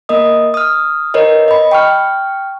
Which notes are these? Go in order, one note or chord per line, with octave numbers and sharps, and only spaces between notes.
A#3 A#4 D#5 D#6
D#6 F6
A#4 B4 C#5 D#5
D#5 B5
G5 C#6 F6